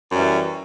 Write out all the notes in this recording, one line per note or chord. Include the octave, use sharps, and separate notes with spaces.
F#2 E3 G3